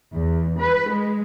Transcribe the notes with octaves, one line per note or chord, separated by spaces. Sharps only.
E2
B4
G#3